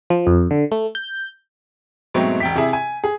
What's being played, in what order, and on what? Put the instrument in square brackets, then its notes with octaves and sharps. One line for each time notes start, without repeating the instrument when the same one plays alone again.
[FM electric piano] F3
F2
D3
A3
G6
[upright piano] G#2 B2 F#3 A3 C4
E1 G5 B6
C3 E4 G#4
G#5
G#4